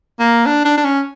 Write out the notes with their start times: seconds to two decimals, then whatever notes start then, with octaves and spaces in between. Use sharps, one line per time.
0.19 A#3
0.46 D4
0.65 D4
0.77 D4
0.85 C#4